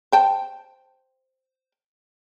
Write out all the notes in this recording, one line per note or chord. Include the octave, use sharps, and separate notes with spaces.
C5 G5 A5